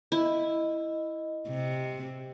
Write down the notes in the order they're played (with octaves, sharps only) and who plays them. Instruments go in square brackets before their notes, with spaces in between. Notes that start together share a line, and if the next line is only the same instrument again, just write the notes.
[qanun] E4 [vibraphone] D#5
[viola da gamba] C3